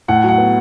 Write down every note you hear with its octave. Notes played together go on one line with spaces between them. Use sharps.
A2 F#5
F#3 F#5
B3